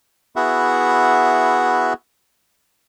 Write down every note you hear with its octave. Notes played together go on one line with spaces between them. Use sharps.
B3 E4 F#4 G#4 E5 F#5